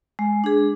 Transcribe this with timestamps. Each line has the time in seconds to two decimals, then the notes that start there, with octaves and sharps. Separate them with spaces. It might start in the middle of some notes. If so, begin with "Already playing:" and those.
0.19 G#3
0.44 D4 G#4